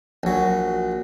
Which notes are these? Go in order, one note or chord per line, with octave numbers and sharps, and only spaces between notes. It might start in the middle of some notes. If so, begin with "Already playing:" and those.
A#1 F#3